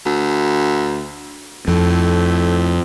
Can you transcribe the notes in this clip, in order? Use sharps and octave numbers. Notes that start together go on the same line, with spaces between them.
D2
F2 A2